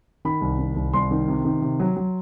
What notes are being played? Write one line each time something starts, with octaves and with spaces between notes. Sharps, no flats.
D#3 B5
C2
D#3
C2
C2 C6
D#3
C3
D#3
C3
F#3
F#3